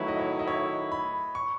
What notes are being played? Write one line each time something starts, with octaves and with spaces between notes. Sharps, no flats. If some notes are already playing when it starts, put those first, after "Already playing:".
Already playing: D#3 F#3 A3 E4 B4 C#5
D#5
C#5
D#5
C#5
B5
C#6